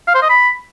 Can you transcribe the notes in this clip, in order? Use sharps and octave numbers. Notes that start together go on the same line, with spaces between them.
F5
C5
D#5
B5